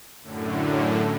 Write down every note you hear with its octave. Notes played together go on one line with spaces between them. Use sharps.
F#2 A2 D3